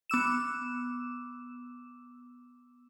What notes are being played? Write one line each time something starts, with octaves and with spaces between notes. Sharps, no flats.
B3 D6 E6 E7